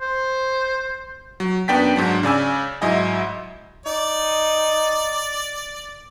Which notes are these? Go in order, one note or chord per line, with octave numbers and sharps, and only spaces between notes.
C5
F#3
F#2 B3 D4 G5 A6 B6
G#2 F#3 D4
C#3 D5 G#5 E6
G#2 F#3 E4 D#5 G#5
D#4 D5